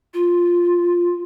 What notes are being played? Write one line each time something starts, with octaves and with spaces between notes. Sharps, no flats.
F4